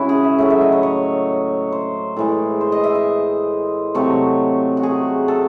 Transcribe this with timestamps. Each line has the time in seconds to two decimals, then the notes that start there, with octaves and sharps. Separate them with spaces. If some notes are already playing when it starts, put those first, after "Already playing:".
Already playing: C#3 E3 G#3 C#4 E4 F#4
0.09 G#4
0.24 E5
0.38 A2 F#3 A3 E5
0.50 E5
0.61 D#5
0.72 C#5
0.83 C#5
1.72 C5
2.17 A2 E3 G#3
2.61 C5
2.72 D#5
2.84 E5
2.95 D#5
3.95 C3 F#3 A3 C#5
4.77 F#4
4.83 G#4
5.28 A4